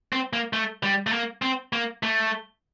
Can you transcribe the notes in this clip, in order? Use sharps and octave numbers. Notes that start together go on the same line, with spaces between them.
C4
A#3
A3
G3
A3
A#3
C4
A#3
A3